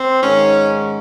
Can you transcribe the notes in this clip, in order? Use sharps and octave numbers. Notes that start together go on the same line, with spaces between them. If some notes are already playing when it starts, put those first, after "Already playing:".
Already playing: C4
G#2 D#3 C#4